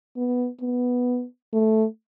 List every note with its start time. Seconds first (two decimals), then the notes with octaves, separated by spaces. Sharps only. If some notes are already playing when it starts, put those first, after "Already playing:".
0.16 B3
0.61 B3
1.53 A3